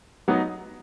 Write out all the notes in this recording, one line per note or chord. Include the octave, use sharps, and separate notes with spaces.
F#3 B3 D#4